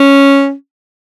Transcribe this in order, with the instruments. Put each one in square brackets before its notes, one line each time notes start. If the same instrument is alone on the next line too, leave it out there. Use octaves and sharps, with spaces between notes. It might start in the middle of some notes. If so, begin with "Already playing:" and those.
Already playing: [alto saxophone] C#4